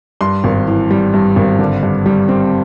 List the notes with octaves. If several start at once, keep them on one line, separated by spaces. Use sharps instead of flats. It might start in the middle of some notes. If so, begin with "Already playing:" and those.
G2 C6
G#1
E3
G3
G2
G#1
D3
G2
G3
C4